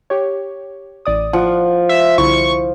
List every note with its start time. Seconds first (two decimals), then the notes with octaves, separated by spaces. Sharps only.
0.10 G4 C#5
1.05 A1 D5 D#6
1.33 F3 F#5
1.89 E5
2.18 C2 D3 E4 C#6